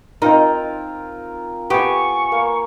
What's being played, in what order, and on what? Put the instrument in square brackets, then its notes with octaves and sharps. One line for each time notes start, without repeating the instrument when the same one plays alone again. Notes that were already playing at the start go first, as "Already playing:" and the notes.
[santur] C4 F4 A#4 [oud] D#4
[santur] B3 G#5 [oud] G4 [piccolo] C#6
[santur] A#3